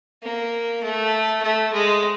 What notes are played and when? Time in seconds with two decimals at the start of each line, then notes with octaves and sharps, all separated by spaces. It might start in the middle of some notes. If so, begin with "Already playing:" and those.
0.23 A#3
0.83 A3
1.42 A3
1.73 G#3